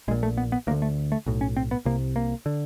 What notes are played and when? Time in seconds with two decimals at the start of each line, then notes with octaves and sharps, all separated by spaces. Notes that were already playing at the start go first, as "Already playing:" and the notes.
0.08 A#1 G#3
0.11 A#2
0.23 A3
0.37 B3
0.52 B3
0.67 D2 A#3
0.71 D3
0.82 A3
1.12 A3
1.26 B1 A2
1.41 C#4
1.57 C4
1.71 B3
1.85 C2 C3 A#3
2.16 A#3
2.46 D3